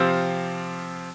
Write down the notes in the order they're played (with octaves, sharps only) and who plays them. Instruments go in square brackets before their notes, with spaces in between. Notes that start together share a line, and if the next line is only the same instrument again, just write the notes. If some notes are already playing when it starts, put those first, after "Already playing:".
Already playing: [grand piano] C3 F3 C4 F4